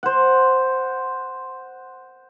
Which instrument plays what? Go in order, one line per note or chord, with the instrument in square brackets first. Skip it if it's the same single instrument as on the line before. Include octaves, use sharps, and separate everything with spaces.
[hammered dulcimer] C5 F#5